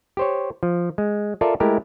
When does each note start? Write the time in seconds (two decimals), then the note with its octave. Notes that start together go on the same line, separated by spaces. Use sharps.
0.17 G4 C5 C#5
0.63 F3
0.98 G#3
1.41 F4 A4 A#4 D5 E5
1.60 G#3 A3 E4 G4 A#4